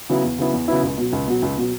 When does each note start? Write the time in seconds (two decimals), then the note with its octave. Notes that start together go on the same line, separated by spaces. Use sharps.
0.09 C#3 F#3 B3 E4
0.24 E2
0.38 C#3 F#3 B3 E4
0.53 E2
0.68 C#3 F#3 B3 E4
0.83 C#2
0.98 B2 F#3
1.13 C#2
1.28 B2 F#3
1.42 C#2
1.57 B2 F#3